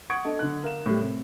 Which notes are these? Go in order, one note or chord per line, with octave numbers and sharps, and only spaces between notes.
F#5 C#6 D#6 G#6 C#7 D7
D4 A4 D#5
D3 F#6
A#4 F5 E7
A2 G3
C3